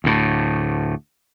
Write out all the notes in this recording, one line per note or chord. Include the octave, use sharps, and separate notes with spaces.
D2 A2